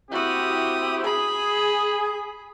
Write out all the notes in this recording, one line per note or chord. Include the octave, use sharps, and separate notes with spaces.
C4 E4 F#4 G4 D#6
G#4 B5